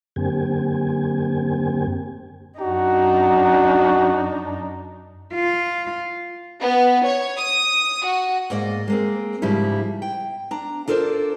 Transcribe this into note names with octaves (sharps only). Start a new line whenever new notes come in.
F#2 D3 A#3 C4 G4 G#5
F#2 D4 D#4 F#4
F4
B3
C#5
D#6
F#4
G#2 A#3 D5 D#5
G#3 A#3 C4
G#2 C#3 F3 G3 E4
G5
D4 A#5
D4 F4 A4 A#4 C5 D5